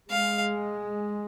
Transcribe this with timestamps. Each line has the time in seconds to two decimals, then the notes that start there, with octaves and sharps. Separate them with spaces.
0.10 G#3 F5